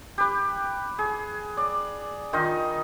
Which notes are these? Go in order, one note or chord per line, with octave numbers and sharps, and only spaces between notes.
G4 B4
G#4
D5
D#3 D#4 F4 D#5